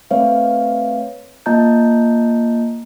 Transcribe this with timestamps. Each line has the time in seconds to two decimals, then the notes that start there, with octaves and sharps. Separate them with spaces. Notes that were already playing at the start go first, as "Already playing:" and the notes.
0.11 A3 C4 B4 C#5 E5 F5
1.46 A#3 F4 D#5 A5 A#5 G6